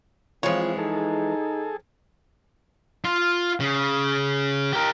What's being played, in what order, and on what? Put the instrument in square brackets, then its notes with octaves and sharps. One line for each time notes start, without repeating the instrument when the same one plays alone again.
[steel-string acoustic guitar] E3 G#3 [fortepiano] F3 C#5 [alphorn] C4 [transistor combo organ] F4
[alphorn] D#4 [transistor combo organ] G#4 A4
[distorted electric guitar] F4
C#3
G4 A#4